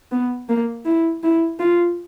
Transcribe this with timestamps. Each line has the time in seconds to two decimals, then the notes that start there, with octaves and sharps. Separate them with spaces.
0.11 B3
0.49 A#3
0.85 E4
1.23 E4
1.60 F4